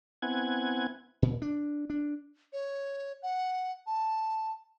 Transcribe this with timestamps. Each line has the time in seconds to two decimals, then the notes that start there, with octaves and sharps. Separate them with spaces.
0.22 B3 C4 E4 F#5 G#5 G#6
1.22 A#2
1.42 D4
1.90 D4
2.53 C#5
3.23 F#5
3.87 A5